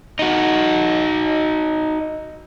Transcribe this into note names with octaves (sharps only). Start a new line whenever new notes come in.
D#4 F#4